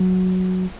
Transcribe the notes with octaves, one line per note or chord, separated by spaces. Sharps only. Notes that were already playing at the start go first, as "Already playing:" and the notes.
Already playing: F#3